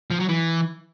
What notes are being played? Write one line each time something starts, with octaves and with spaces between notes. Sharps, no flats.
F3
F#3
E3